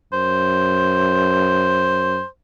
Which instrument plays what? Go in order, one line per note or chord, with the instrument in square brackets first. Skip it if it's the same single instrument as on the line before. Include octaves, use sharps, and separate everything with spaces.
[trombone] F#2 [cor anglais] C5